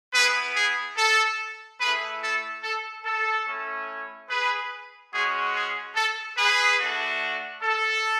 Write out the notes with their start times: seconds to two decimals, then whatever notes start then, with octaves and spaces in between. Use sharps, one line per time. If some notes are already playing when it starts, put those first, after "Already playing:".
0.14 B3 E4 G#4 B4
0.55 G#4
0.97 A4
1.80 A3 E4 G#4 B4
2.22 A4
2.63 A4
3.05 A4
3.47 A3 C#4 E4
4.30 G#4 B4
5.13 G#3 C#4 F#4 G#4
5.55 G#4
5.96 A4
6.37 G#4 B4
6.79 A3 D4 F#4
7.62 A4